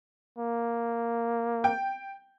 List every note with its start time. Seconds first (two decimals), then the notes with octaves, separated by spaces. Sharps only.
0.38 A#3
1.64 G5